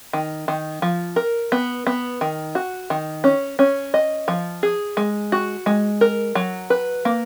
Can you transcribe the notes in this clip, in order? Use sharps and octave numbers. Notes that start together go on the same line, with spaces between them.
D#3
D#3
F3
A#4
B3
B3
D#3
F#4
D#3
C#4
C#4
D#5
F3
G#4
G#3
F#4
G#3
A#4
F#3
B4
A#3